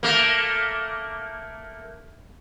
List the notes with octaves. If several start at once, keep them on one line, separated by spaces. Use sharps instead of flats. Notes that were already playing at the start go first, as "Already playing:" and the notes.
A3 A#3